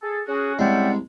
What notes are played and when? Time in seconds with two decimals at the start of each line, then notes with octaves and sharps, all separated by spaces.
0.02 G#4 A4
0.27 C#4 F#4 G#4
0.59 C2 G#3 C#4 D5 E5 F#5 G5